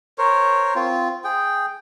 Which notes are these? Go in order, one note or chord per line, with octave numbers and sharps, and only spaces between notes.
A#4 C5 C#5
C4 F4
G#4 G5